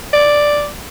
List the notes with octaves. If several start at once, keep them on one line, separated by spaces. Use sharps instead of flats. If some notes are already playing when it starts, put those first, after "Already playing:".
D5